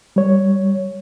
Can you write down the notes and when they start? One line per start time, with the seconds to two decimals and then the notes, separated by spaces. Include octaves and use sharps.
0.16 G3 C#5